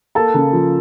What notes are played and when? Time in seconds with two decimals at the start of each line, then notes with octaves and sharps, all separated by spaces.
0.15 A#3 A4 A5
0.34 C#3
0.53 F3